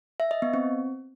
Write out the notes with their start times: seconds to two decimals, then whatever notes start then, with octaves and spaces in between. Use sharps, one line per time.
0.20 E5
0.31 D#5
0.42 B3
0.54 C4